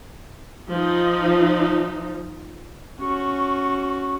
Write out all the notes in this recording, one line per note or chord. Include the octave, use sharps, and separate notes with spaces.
F3 D#4
C#4 F#4 C#6